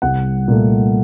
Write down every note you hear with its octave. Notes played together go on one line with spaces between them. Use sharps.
C2 F#5
A#2 A3